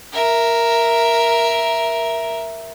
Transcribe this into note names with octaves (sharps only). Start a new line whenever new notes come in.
A#4 E5